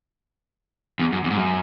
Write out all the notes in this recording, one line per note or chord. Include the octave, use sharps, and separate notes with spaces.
E2
F#2
E2
G#2
F#2